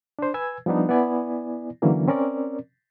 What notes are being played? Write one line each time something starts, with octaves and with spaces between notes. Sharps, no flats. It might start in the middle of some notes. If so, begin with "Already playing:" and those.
D4 C5
B4 G#5 E6 G#6
F3 G3 B3 D4 D#4
B3 E4 D5 G#5
D3 E3 F#3 A#3 C#4
C4 C#4 A#4 D5